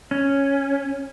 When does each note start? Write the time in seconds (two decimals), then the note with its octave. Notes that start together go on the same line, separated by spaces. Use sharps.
0.11 C#4